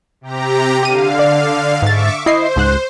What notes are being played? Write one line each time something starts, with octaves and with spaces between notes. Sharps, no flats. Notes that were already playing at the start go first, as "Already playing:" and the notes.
C3 G4 A#5
D3 G4 F5 D#7
D5
G#2 E5 C#6 D6 A6
E4 C5 D#5 C7
C#2 G#2 F#6